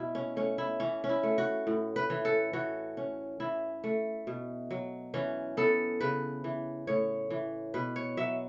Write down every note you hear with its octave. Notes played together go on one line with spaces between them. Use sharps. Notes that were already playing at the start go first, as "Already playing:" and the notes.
Already playing: B2 E4
C#4
A3 C#4
E4
E3 C#4
C#4
E4
A3
F#4
A2
B4
E3
A4
E3 F#4
C#4
E3 E4
A3
B2
F#3
E3 C#4
B3 A4
C#3 B4
E3
A2 C#5
E3
B2 B4
C#5
F#3 E5